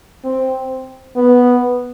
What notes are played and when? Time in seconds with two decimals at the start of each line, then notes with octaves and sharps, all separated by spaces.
0.25 C4
1.16 B3